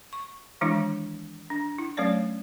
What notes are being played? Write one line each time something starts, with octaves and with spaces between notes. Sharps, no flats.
C#6
D#3 E3 G#3 D4 E4
D4
E4
F#3 A3 C#4 C#5 D5